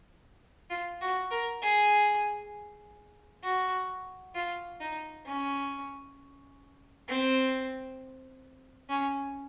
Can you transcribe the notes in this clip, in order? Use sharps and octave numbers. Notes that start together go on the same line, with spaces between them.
F4
F#4
A#4
G#4
F#4
F4
D#4
C#4
C4
C#4